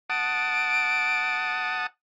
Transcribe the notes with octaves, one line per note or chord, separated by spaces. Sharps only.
F#5 A5 D#6 D7